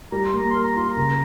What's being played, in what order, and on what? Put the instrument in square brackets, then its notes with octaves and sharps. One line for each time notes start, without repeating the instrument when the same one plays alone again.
[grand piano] G3 [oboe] A#5
[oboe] C6
[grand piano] A#3 [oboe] A#5
[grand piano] A#4 [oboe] C6
[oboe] A#5
[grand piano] F4 [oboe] C6
[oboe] A#5
[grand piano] C#3